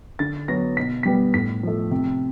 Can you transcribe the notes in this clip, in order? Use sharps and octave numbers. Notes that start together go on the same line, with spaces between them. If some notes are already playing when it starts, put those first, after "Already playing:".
D3 A6
F#3 B3 A#6
B2 B6
G3 B3 B6
A2 B6
F3 A3
C3